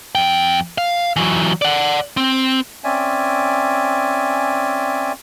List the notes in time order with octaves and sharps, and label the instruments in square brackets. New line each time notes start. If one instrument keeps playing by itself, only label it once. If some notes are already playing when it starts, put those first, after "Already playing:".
[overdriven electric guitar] F2 G5
F5
E3 F#3
D5 F#5
C4
[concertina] C4 C#4 D5 E5 G#5